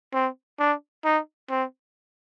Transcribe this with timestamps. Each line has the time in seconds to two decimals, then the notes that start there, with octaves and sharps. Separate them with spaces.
0.14 C4
0.59 D4
1.05 D#4
1.50 C4